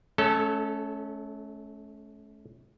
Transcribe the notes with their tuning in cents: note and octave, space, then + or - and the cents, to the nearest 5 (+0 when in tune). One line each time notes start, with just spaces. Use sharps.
A3 -40 C#4 +0 A4 +0